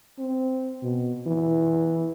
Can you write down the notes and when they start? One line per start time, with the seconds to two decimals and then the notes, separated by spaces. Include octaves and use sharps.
0.19 C4
0.83 B2
1.27 E3